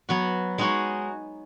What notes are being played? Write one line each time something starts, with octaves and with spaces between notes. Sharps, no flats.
F#3 B3 F#4
G#3 D#4 F#4 C#5